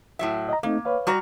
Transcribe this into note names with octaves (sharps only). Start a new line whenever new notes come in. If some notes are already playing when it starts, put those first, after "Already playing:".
A2 F#3 E5
D#5 A#5
A3 A#3 C4 D#4
B4 C#5 F5
G3 F#4 A#5